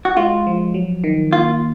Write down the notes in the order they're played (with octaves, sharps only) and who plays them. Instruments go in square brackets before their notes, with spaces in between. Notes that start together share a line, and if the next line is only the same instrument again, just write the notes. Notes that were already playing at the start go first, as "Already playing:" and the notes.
[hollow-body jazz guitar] F#4
[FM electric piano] G#3 [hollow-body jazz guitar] F4
[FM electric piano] F3
F#3
D#3
[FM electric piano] A#3 [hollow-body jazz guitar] F4